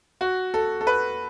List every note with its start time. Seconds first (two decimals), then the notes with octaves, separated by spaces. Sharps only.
0.21 F#4
0.54 A4
0.81 A4
0.87 B4